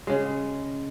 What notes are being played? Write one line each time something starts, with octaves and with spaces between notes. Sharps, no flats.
C#3 G#3